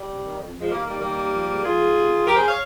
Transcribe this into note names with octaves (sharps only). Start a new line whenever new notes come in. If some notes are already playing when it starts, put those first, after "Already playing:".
Already playing: G3
C3
D#3
F2
F2
F3 G#3
D#3 G3 A#3
D#2 G3 A#3
D#3 G3 A#3
D#2
F3
G#2
F3 F4 G#4
G#2
C3
D#3
F2 G4 A#4
G#4 C5
C#5 F5